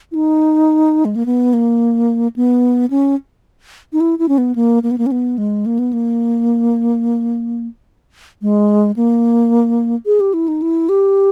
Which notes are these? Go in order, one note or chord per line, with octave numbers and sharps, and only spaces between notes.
E4
D#4
G#3
A#3
B3
A#3
B3
C#4
D#4
E4
E4
C#4
B3
A#3
A#3
B3
A#3
C#4
B3
G#3
A#3
B3
A#3
G#3
A#3
G#4
G4
E4
D#4
E4
G4